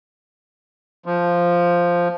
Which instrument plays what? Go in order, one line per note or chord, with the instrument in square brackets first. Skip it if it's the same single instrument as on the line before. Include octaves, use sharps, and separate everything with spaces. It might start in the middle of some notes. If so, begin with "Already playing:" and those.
[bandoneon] F3